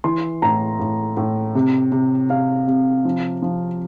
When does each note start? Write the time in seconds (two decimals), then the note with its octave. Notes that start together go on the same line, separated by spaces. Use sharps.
0.04 E3 C6
0.42 A2 A#5
0.80 A2
1.17 A2
1.55 C3
1.92 C3
2.29 C3 F5
2.67 C3
3.05 F3
3.42 F3